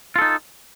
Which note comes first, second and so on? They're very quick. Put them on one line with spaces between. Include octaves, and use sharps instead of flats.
F4 A4 D#4